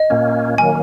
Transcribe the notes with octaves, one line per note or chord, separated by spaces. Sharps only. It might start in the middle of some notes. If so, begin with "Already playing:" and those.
Already playing: D#5
A#2 A#3 C#4
D#3 F#3 A#3 G#5